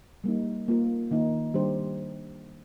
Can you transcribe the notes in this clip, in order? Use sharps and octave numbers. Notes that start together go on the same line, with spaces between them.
G3 A#3 D#4
A#3 F4 A#4
D#3 A#3 D#4
D#3 G3 D4 G4 C5